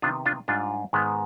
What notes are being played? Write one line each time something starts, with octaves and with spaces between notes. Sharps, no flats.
C3 D#3 B3 D4 F4
D4 F4
G#2 G3 D4 F4
G#2 D#3 G#3 B3